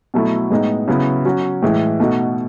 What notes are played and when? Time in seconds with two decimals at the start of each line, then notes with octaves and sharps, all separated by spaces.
0.14 B2 F#3 A3 E4
0.51 A2 G#3 B3 D#4
0.88 C#3 F#3 B3 E4
1.25 F#3 C#4 F#4
1.62 A2 E3 G#3
2.00 B2 A3 D#4 F#4